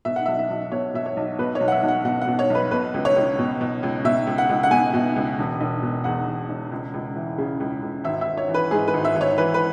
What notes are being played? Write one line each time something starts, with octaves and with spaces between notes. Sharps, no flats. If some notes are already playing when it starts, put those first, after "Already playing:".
B2 E5
F#5
B1 E5
E5
B1
B2 C#5
B2 E5
C#5
B1
B2 B4
C#5
B1
F#5
E5
B1
F#5
B2 F#5
F#5
B2
C#5
B1 B4
B2 B4
C#2
C#5
C#2
B2
B2
C#2
B2 E5
C#2
F#5
C#2
F#5
B2 G#5
B2
C#2
E1
E1
B2
E2 F#5
E1
E1
C#2
C#2
E3
C#3
C#2
C#2
G#1 E5
E5
G#1
C#5
E3
B4
G#2 G#4
B4
G#1
E5
G#1
C#5
E3 B4
B4